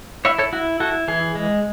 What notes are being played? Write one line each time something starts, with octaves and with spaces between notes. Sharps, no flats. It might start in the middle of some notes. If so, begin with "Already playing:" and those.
E4 C#5 E5
A4 C#5
E4 F#4
E4 F#4 A4
E3 G#4
G#3